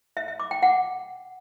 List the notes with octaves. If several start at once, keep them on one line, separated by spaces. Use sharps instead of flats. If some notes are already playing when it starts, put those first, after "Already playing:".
E5
E5
D6
G5
F#5